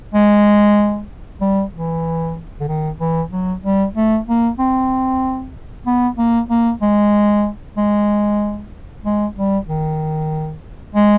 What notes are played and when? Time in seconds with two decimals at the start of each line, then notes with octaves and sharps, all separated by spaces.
0.14 G#3
1.40 G3
1.73 E3
2.60 D3
2.68 D#3
3.00 E3
3.31 F#3
3.63 G3
3.95 A3
4.27 A#3
4.59 C4
5.86 B3
6.18 A#3
6.50 A#3
6.81 G#3
7.77 G#3
9.04 G#3
9.36 G3
9.67 D#3
10.94 G#3